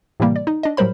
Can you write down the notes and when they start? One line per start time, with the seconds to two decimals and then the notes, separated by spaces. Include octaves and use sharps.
0.20 A2 C3 E3 G3 A#3
0.36 D5
0.47 D#4
0.63 D4 D#5
0.77 A2 F#3 G3 A#4 C5 B5